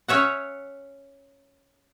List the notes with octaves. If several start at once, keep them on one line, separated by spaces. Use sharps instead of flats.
C#4 C#5 E5 F#5